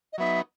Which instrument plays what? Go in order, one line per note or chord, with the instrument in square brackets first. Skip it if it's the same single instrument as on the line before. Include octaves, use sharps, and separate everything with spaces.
[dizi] D#5
[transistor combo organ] F#3 B3 D#4 [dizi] E5